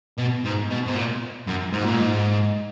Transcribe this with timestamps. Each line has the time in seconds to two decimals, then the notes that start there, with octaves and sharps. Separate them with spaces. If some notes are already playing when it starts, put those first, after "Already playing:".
0.18 B2
0.45 G#2
0.71 B2
0.87 G#2
0.96 A#2
1.47 F#2
1.72 G#2
1.86 A#2
1.99 G#2